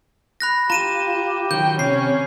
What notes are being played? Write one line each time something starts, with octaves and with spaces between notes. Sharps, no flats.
B5 F#6 A#6
F4 G4 A#5 D#7 E7
D#3 F#3 G5 G6
C3 C#4 C7